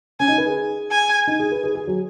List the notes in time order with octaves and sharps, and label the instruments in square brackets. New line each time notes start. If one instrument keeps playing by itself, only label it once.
[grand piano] C#4 [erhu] G#5
[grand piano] D#4
B4
G#4
[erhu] G#5
[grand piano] D#4
G#4
B4
G#4
G#4
F#3